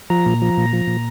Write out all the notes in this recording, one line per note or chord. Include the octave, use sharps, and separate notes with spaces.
F3 A#5
A#2
F3
A#2
F3
A#2